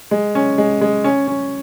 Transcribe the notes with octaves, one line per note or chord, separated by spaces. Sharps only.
G#3
C#4
G#3
G#3
C#4
C#4